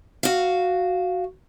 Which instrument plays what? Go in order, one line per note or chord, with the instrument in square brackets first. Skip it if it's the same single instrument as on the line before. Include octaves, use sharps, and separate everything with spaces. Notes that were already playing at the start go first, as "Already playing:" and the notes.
[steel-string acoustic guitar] F#4 F5